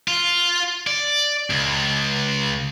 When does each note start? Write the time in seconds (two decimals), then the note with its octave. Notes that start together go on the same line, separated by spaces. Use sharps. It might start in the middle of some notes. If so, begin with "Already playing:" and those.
0.08 F4
0.87 D5
1.50 C#2